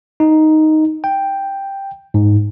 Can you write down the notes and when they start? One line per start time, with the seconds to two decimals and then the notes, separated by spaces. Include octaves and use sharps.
0.20 D#4
1.04 G5
2.14 G#2